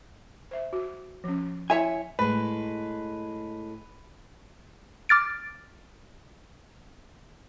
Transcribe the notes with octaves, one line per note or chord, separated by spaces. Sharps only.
C5 E5
F#4
F3 C#4
E4 C#5 E5 G#5
A2 G#3 B4
D6 F6 A6 D7